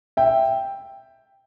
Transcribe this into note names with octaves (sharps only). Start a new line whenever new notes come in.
E5 G5